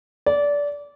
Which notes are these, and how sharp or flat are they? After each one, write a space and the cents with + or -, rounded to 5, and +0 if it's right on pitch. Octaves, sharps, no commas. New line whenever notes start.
D5 -20